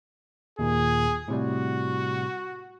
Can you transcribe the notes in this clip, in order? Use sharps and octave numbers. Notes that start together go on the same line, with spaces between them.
D#2 A#2 D#3 G#4
A2 C3 G3 F#4